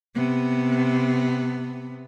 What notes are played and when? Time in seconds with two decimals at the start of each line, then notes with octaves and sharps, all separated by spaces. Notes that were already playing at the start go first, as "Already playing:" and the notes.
0.15 C3 B3